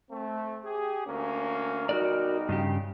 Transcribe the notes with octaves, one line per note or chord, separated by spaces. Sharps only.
A3 C4
G4 G#4
D2 A#3 C#4
B1 G3 D#4 F#4 A#4 D5
G2 C#3 G4